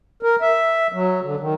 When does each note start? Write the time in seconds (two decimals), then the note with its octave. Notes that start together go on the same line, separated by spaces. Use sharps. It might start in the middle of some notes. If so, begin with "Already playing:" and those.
0.23 A#4
0.42 E5
0.93 F#3
1.23 D3
1.40 D#3